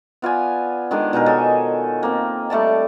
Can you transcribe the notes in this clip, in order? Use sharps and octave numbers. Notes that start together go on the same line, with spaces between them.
B3 F4 D5 G#5
D#3 G#3 D4
B2 D#4 G#4 A#4
G#4 A4 C#5 G#5
A#3 C4
G3 A3 D5 A5